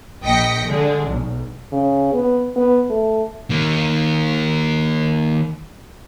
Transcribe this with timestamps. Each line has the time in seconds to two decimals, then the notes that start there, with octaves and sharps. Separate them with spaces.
0.23 A#1 D#5 G5 A#6 B6 C#7
0.67 D3 G#3 D4
1.08 B1
1.72 C#3
2.13 B3
2.56 B3
2.90 A3
3.50 D#3 A#3